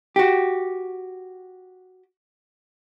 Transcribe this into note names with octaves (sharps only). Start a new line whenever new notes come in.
F#4 G4